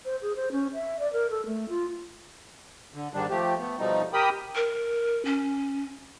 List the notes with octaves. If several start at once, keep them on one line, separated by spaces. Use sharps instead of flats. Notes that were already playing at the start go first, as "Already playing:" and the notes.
C5
G#4
C5
C#4
E5
D5
A#4
A4
A3
F4
D3
G#2 D#3 G3 D4
F3 A3 G4
A3 B3
B2 F3 G3 A3 D#4
G4 A#4 G5 B5 D#6
A#4
C#4